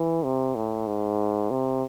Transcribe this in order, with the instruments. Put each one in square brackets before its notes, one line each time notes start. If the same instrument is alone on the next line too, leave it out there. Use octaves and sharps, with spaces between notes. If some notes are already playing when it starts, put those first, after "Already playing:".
Already playing: [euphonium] E3
C3
A2
G#2
C3